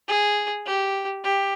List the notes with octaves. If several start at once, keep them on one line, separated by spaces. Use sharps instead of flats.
G#4
G4
G4